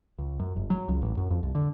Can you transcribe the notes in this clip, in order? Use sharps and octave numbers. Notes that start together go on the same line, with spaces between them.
C#2
F#2
G1
F#3
C#2
A1
F#2
F2
C2
D3